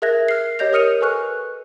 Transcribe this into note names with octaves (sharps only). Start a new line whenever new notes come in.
G#4 A#4 E5 F#6 G#6 A#6
F6 C7
G4 C#5 D#5 G6 A#6 F7
A#4 D#6 F6 C#7 D#7 F7
A4 B4 G#5 C#6 F6 F#6